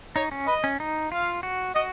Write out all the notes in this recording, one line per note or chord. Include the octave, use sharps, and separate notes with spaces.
D#4 C#5
C#4
B4 D#5
C#4
D#4
F4 F5
F#4
F#4 D#5